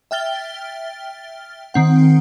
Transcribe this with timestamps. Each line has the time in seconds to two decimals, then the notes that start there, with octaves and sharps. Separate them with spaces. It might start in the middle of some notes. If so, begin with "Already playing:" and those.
0.11 E5 G5 F6 A6 G7
1.74 D#3 C4 F#5